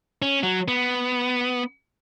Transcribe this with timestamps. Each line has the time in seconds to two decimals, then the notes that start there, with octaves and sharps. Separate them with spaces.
0.22 C#4
0.43 F#3
0.68 B3